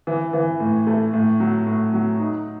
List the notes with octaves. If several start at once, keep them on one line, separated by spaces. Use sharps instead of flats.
E3
E3
A2
A3
A2
F#3
A2
F#3
D#4